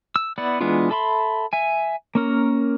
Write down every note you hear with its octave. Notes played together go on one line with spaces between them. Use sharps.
E6
B3 E4 D5 F#5
E3 G#3 B3 D4 F4
A4 E5 B5 C6
E5 G#5
A#3 C#4 A#4